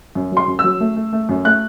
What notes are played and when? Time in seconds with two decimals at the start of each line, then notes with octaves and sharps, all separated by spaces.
0.15 F#2
0.32 F#3 C6
0.48 F#2
0.59 E6
0.64 F#3
0.80 A3
0.96 A3
1.13 A3
1.29 F#2
1.45 A3 F#6